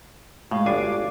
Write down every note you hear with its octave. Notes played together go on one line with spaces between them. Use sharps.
A2 G#3 F#4 F5
G1 D4 D5 G#5 D6 C7